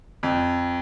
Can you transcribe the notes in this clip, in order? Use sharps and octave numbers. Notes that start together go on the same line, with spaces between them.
F2